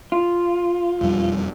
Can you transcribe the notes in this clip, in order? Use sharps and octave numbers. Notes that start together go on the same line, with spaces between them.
F4
E1 F2 G3